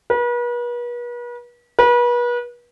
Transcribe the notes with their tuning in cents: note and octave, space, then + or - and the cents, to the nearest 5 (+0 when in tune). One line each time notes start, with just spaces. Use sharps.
B4 -40
B4 -35